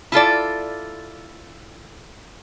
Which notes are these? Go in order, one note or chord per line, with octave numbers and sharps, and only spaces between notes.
E4 F4 A4 D5